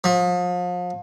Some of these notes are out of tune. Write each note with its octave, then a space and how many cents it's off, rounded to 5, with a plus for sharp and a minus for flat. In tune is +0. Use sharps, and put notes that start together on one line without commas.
F3 +35